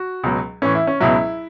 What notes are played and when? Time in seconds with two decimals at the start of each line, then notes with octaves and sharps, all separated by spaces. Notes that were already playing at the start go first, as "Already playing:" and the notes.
Already playing: F#4
0.23 C#2 B2 F#3
0.62 A2 E3 C#4
0.75 E4
0.87 C#4
1.00 C#2 B2 F#3 E4